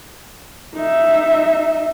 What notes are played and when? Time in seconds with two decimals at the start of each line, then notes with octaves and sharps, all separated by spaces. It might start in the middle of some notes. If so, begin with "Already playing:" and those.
0.75 D#4 E5